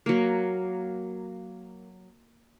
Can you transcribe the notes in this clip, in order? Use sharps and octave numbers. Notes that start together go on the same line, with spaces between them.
F#3 A#3